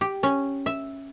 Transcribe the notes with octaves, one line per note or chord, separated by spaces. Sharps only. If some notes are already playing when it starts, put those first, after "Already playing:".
G4
C#4
E5